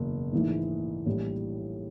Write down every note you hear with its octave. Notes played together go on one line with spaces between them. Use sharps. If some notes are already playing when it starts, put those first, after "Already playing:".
Already playing: F#1 E2 B2
A#1 G#2 E3 A3
A#1 A2 E3 G3